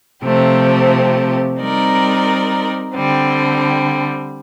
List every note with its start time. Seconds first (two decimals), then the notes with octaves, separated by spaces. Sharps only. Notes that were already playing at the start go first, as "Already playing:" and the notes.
0.24 C3 F3 A3 C4 G4
1.59 G3 C4 D#4 A#4 D5
2.94 D3 G3 C4